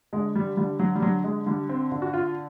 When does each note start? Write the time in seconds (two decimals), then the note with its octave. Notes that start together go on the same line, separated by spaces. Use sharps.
0.13 D3 G#3
0.36 G3
0.57 D3 G3
0.79 F#3
0.96 G3
1.02 D3 F#3
1.24 G#3
1.46 D3 G3
1.69 C4
1.92 D3
2.02 F#4
2.13 F4